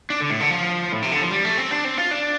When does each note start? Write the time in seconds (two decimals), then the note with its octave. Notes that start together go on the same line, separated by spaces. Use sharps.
0.10 D4
0.20 D3
0.30 A2
0.40 D3
0.50 F3
0.93 A2
1.02 C3
1.12 D3
1.21 F3
1.31 G3
1.45 A3
1.58 C4
1.71 D4
1.85 C4
1.98 F4
2.11 D4